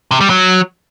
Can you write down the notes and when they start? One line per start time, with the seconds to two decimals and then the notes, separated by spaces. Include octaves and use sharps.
0.11 C3
0.21 G3
0.30 F#3